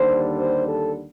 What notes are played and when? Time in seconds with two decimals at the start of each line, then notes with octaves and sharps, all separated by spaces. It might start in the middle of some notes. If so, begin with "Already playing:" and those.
Already playing: D#2 D3 G3 C5
0.38 C5
0.67 A4